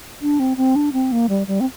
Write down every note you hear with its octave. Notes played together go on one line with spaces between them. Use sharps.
D4
C4
C4
D4
C4
A#3
G3
G3
C4